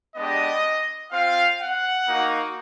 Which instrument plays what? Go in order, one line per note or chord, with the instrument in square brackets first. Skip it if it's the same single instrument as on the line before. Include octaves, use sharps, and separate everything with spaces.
[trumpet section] G#3 B3 D4 G4 D#5
C4 F4 F5
F#5
A#3 D#4 F#4